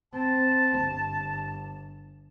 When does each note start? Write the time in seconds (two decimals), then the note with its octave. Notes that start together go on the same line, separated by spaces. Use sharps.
0.13 C4 A5
0.80 G1